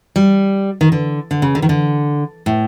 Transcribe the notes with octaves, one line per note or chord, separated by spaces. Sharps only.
G3
D#3
D3
D3
C#3
D3
D#3
D3
A2